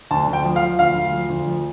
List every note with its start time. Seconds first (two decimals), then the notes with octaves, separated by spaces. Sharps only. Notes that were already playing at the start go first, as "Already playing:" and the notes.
0.11 D2 A5
0.27 D2
0.33 G5
0.45 F3
0.56 F5
0.62 F3
0.79 D2 F5
0.95 D2
1.12 F3
1.30 D2
1.47 F3